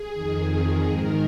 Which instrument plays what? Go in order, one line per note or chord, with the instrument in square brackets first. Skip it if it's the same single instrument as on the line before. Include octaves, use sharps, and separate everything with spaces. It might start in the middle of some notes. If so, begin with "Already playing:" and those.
Already playing: [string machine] G#4
F2 D#3
G#2 D#3 A#4